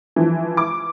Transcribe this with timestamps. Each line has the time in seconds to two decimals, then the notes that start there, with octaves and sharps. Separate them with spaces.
0.16 E3 F3
0.57 D6